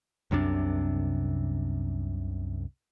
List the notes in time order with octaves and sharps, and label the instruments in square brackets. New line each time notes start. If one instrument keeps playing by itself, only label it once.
[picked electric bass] C2 F#2 C3 D4